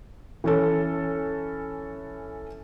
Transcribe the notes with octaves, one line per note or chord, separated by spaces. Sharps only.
E3 C#4 A4